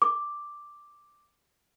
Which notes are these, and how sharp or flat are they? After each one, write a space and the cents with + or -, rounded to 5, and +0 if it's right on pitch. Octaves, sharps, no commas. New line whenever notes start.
D6 +0